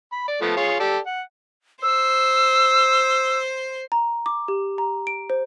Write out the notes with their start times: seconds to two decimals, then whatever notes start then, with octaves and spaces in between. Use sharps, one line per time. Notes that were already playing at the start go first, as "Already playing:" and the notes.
0.12 B5
0.28 D5
0.42 F3 A3 B3
0.57 F4 G#4 C#5
0.80 G4 A4 D5
1.06 F#5
1.83 C5 E6
3.92 A#5
4.26 D6
4.48 G4
4.78 A#5
5.07 D7
5.30 C5